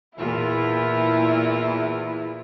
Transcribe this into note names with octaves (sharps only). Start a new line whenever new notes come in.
E2 A#2 E4 F4